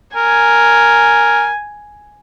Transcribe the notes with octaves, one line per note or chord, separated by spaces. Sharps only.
A#4 G#5